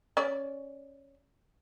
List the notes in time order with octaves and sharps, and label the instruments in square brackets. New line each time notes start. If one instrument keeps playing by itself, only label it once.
[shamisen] C#4 D5